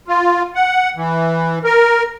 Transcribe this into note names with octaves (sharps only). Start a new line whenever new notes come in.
F4
F#5
E3
A#4